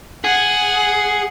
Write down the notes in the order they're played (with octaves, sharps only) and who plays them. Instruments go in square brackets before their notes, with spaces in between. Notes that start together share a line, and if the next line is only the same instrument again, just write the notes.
[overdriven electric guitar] G#4 [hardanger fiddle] F#5